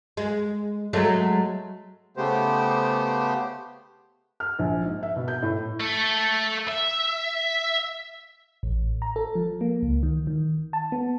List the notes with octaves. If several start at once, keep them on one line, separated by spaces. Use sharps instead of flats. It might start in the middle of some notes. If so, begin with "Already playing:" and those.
G#3
F#3 G#3 A3
C#3 A3 B3 G4 C5
F6
A#1
G#2
E5
B2
G6
A2
A3 A4
E5
A1
A#5
A4
F3
A#3
C#2
D#3
D#3
A5
B3